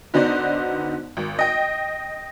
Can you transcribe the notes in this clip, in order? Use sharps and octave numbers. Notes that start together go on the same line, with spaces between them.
D3 B3 D#4 F#4 C5 D5
G#1
D#5 G5